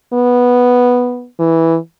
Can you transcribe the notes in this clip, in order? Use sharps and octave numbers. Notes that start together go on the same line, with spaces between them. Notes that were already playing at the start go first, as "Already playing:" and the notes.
B3
E3